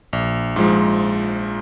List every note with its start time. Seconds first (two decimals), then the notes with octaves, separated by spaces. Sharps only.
0.13 A#1
0.56 G#2 F3 G#3